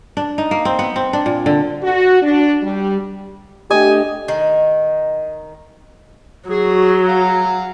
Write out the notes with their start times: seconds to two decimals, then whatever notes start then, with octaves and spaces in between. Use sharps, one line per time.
0.17 D4
0.38 D#4
0.51 A#3
0.65 C4
0.79 B3
0.96 C4
1.13 D4
1.26 A#2
1.46 D3
1.83 F#4
2.22 D4
2.63 G3
3.71 A3 D4 G4 D#5 G#5
4.28 D#3
6.49 F#3 F#4 G#4
7.05 F5 F#5 A#5